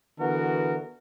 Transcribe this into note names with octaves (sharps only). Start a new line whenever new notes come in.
D3 E3 B3 F#4 A#4